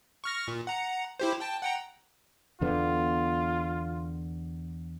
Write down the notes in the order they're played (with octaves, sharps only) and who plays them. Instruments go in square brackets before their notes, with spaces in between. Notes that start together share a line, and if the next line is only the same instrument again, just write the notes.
[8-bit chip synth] C#6 F6 A#6
A#2
F#5 A#5
E4 G4 C5
G5 A5
F#5 G5 A#5
[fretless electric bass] E2 D3 B3 [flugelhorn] F4